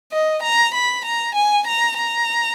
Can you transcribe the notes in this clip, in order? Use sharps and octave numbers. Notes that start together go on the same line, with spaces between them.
D#5
A#5
B5
A#5
G#5
A#5
A#5